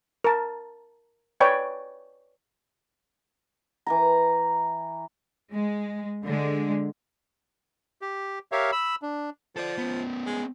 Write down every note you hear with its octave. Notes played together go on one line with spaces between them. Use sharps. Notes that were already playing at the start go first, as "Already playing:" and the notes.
A#4 A5
B4 C#5 D5 G5 B5
E3 G#5 A#5
G#3
D3 G#3
G4
G4 A#4 C#5 E5 F5
B5 E6
D4
F3 A4 D5
B3 C#4
G#3